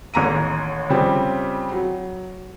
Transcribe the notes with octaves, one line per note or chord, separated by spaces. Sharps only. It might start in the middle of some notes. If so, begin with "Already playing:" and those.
A1 D#2 A#5 D#7
C#3 F3 G3 C4
F#3